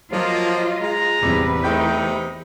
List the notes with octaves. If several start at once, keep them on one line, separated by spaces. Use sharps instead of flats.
F3 F#3 A#3 F4 D#5
G#3 A#5
A1 E2 C3 G3 B4
C3 A3 D#4 G5 G6